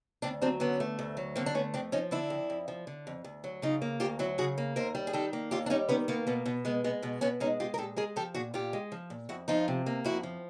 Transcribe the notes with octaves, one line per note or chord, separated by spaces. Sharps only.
D2 C4 D4
F#3 C4 D4
D3 B3 C#4
A3
D2
F#3
D3 A#3 C4
D4
A3 B3 C#4
F2 C4 D4
F3 C#4 D#4
D3 D4 E4
F2
F2
F3
D3
F2
D2
F#3
C#3 D#4 F4
A#3
D2 F4 G4
F#3 E4 F#4
C#3 F#4 G#4
A#3
D#2 A#4 C5
G3
G#4
D#3 G4 A4
A#3
D#2 F4 G4
D4
G3 C#4 D#4
D#3 B3 C#4
A#3 B3
B2 B3
B2 B3
G#3 B3
G#3 B3
B2 B3
B2 B3 C#4
G#3 C#4 D#4
G#3 F4 G4
A#4
A#2 G4 A4
G#3 G#4 A#4
F3 G4 A4
A#2 F#4 G#4
A#2 F4 G4
G#3
F3
A#2
F2 E4 F#4
F3 D#4 F4
C3
A#3
F2 E4 F#4
F3